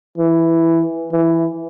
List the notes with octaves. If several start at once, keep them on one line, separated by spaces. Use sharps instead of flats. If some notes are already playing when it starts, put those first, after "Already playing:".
E3
E3